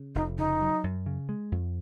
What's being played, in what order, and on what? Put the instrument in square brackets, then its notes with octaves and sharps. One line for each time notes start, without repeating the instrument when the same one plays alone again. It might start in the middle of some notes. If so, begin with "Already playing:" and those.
Already playing: [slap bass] C#3
[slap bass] F1 [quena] D#4
[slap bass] C#3 [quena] D#4
[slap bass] F#3
F#2
C#3
G#3
F2